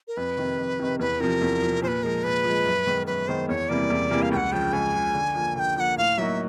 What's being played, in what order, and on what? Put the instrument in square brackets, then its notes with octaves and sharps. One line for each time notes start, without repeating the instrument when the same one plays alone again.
[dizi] A#4
[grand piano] F2 [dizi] B4
[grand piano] C3 D#3
F2
C3 D#3
[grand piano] E2 [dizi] B4
[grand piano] C3 F3 [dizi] A#4
[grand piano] E2
C3 F3
[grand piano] A#2 [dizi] C5
[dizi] B4
[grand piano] F3 G#3 [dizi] A#4
[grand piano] A#2 [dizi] B4
[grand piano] F3 G#3
F#2
D#3 G#3 B3
[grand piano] F#2 [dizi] B4
[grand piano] D#3 G#3 B3 [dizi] C5
[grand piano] E2 [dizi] C#5
[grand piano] C3 E3 G3 A#3 [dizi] D5
[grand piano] E2
C3 E3 G3 A#3
[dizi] F5
[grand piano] C#2 [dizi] G5
[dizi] F#5
[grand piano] C#3 F3 [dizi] G5
[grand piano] C#2 [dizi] G#5
[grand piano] C#3 F3
D3
F3 A#3
[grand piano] D3 [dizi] G5 G#5
[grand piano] F3 A#3 [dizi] F#5 G5
[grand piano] A2 [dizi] F5
[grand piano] F#3 A#3 D#4 F#4 [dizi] E5